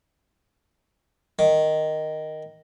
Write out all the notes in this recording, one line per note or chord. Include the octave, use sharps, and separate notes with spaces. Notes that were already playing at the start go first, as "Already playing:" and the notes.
D#3